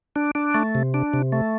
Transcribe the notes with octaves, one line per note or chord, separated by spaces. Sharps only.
D4
D4
A3
C3
D4
C3
A3